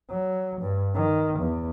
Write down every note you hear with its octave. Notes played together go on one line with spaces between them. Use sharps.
F#3
G2
D#3
E2